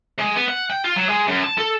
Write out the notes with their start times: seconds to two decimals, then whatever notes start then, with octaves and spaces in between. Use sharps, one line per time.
0.19 G#3
0.36 B3
0.48 F#5
0.70 G5
0.84 F4
0.96 F#3
1.09 G#3
1.27 F#2
1.44 A5
1.58 A4